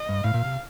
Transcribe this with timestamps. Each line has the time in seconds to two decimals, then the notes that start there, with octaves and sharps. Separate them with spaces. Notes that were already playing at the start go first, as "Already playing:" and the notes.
Already playing: D#5
0.09 G2
0.24 A2 F5
0.34 A#2
0.45 C3